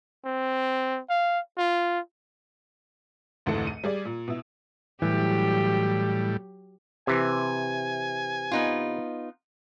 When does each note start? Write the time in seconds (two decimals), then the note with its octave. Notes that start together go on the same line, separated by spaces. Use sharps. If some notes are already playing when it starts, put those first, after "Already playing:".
0.25 C4
1.10 F5
1.57 F4
3.46 F1 D2 G#2 E3 A4 C#7
3.67 D#7
3.84 G3 G#4 D5
4.05 A#2
4.28 B2 E4
5.02 A2 E3 F#3 G3 G4
7.07 C3 E3 G#5
8.51 B3 D#4 F4